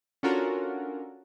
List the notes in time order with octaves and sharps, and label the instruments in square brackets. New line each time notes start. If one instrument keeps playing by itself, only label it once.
[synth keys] C#4 D4 F4 F#4 A4 A#4